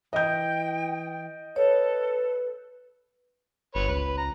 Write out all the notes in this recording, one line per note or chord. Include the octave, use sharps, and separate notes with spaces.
E3 D#5 G5 G6
A4 B4 C#5
G1 B4 C#5
C#2 B4
A#5